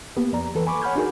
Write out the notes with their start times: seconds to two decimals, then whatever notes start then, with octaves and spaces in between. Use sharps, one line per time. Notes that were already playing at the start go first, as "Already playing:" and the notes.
0.16 D#2 A#3 B3 G4
0.33 F2 D5 A#5
0.55 E3 A4 B4
0.67 G#5 B5 C#6 D6
0.82 C#5 F#5 B5 F6 G6 G#6
0.96 D4 D#4 F#4 G#4 A#4 G#5